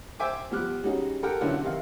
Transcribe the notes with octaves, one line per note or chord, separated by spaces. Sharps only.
C5 E5 G5 G#5 D6
F3 G3 B3 D6 F6 F#6
G3 C#4 D#4 F#4 G#4
G4 A4 A#4 F#5 G5 F6
B1 D3 C#4 D4 E4 F#5
C3 D#3 F5